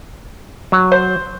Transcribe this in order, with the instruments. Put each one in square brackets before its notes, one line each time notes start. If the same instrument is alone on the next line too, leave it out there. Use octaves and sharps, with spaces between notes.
[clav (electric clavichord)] F#3
[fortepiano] C5